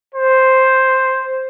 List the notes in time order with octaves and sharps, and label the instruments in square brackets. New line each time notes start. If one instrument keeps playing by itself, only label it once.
[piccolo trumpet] C5